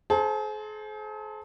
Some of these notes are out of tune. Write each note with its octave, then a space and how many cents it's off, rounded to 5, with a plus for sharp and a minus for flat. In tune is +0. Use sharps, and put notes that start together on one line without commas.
G#4 +45 C5 +5 A5 +25